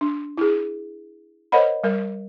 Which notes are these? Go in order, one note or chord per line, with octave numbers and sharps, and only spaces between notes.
D4
E4 G#4
A#4 C5 C#5 D#5 F#5 B5
G3 A#4